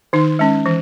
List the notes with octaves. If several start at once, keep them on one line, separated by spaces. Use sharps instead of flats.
D#3 D#4
G#3 C#4
E3